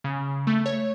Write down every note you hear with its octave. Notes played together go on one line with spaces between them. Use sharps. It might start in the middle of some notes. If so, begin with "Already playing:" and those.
C#3
A3
C#5